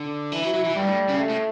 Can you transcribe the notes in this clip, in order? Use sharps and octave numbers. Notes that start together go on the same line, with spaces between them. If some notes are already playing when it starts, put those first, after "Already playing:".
Already playing: D3
E3 E4
F#3
F#3
E3
G2 G3
A2
C#3
A3
A2